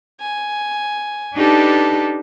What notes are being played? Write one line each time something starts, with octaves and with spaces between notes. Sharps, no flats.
G#5
D4 D#4 G4 A4 B4